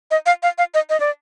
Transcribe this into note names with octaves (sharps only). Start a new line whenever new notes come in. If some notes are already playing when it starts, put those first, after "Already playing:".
D#5
F5
F5
F5
D#5
D#5
D5